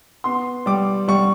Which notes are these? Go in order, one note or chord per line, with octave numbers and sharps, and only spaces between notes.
B3 C6
G3 D6
G3 C#6